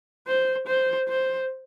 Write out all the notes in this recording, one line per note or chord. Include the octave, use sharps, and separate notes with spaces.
C5
C5
C5